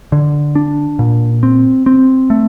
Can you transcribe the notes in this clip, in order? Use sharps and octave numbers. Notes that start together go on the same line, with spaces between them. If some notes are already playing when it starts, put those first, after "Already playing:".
D3
D4
A#2
C4
C4
A3